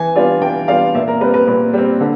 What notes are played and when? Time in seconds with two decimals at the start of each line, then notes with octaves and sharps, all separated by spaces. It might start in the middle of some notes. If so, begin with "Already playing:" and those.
Already playing: E3 G#5
0.16 G3 B3 D4 F4
0.41 E3 G5
0.68 G3 B3 D4 F4 F5
0.95 A#2 E5
1.08 A#4
1.21 G3 C4 B4
1.34 B4
1.47 A#2 B4
1.73 G3 C4
2.01 D3